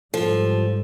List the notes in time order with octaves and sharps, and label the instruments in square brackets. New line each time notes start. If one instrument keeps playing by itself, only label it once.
[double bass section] G#2 G3 [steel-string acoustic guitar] F3 [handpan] A4